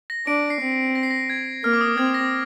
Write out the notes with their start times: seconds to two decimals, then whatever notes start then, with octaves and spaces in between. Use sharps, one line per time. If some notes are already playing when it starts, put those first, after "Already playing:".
0.10 A#6
0.26 D4 D7
0.50 C7
0.61 C4
0.72 C7
0.95 A#6
1.03 C7
1.11 A#6
1.30 G#6
1.64 A#3 F6
1.73 D6
1.81 D#6
1.97 C4 G#6
2.14 A#6